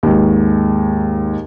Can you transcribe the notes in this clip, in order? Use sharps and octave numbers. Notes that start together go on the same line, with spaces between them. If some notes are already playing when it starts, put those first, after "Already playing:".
D#2 G#2